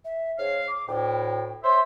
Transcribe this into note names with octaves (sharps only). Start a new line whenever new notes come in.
E5
G#2 C#5 F5
D6
D2 A2 G5
C5 C#5 E5 C6